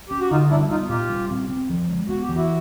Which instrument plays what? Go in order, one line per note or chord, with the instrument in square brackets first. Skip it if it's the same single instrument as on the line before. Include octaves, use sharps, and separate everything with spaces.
[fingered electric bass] C#4 [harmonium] G4
[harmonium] F#4
[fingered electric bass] D3 [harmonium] D#4 F4
[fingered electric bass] G3 [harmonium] D4 E4
[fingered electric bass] B3 [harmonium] D#4 F4
[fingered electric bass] A#2 [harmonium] F4 G4
[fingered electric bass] G3
C4
C4
F3
G#3
[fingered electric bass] B3 [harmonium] F#4
[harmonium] G4
[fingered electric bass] E3
[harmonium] E4 F#4